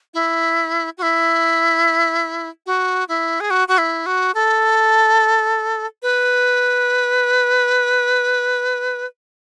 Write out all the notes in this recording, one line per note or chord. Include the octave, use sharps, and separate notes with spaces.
E4
F#4
E4
F#4
E4
G#4
F#4
F#4
E4
F#4
A4
B4